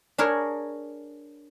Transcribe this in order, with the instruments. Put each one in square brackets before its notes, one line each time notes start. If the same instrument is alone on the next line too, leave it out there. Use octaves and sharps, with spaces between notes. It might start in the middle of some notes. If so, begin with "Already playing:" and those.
[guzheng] D4 G#4 A#4 C#5